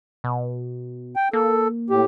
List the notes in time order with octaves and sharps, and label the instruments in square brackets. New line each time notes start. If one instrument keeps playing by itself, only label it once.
[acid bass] B2
[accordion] G5
[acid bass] A#3 [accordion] A4
[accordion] A2 G4